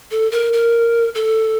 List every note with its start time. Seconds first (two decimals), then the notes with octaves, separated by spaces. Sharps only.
0.11 A4
0.31 A#4
0.53 A#4
1.15 A4